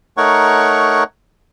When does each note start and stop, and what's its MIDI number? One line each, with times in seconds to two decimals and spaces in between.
0.17 1.04 57
0.17 1.04 63
0.17 1.04 70
0.17 1.04 73
0.17 1.04 78
0.17 1.04 85